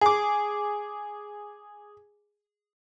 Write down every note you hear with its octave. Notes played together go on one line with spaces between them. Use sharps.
G#4 D6